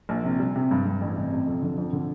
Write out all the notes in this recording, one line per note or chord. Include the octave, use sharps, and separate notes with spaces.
A#1
C3
G3
C3
G2
G2
A1
C3
C3
F2
D3
F2
D3